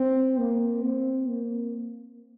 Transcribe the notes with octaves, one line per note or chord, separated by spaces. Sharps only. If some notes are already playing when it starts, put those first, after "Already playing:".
Already playing: C4
A#3
C4
A#3